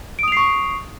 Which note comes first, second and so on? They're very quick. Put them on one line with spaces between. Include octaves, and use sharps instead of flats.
D7 D#6 F7 C7 C#6